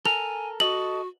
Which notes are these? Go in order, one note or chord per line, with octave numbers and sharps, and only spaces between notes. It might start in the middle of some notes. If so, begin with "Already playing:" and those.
A4 A#4 G#5 F7
F#4 A4 D#5 F#7